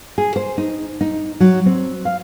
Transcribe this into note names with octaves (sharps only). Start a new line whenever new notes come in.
G#4
C5
D#4
D#4
F#3
C4
F5